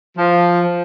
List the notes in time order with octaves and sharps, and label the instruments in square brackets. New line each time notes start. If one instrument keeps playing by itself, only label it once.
[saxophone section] F3